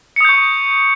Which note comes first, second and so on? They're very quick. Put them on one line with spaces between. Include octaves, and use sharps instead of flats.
C#7 D#6 G6 C#6